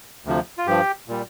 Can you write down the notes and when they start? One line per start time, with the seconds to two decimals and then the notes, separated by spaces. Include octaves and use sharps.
0.25 D2 C3 F3
0.58 F4
0.67 G2 F3 G4
1.08 A#2 G3